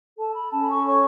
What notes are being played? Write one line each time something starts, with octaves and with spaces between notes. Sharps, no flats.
A4 A5
B5
C#4 A5
B5
C#6
C#5 C#6